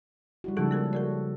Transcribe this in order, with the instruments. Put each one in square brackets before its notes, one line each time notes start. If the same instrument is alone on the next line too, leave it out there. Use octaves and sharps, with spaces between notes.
[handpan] G3 E4 F#4
[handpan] C#3 F3 A4 [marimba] G#3 D#4 G#4
[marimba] A#3 G#4 A#4
[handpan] F#4 [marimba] A4 A#4 D5